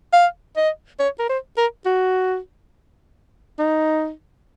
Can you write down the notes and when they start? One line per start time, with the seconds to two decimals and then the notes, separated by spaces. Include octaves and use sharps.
0.13 F5
0.56 D#5
0.99 C#5
1.19 A#4
1.29 C5
1.57 A#4
1.86 F#4
3.59 D#4